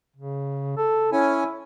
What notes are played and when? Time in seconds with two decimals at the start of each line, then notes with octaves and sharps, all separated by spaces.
0.16 C#3
0.77 A4
1.12 C#4 E4 G#5